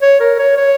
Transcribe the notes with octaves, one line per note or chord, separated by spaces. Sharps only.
C#5
A#4
C#5
C#5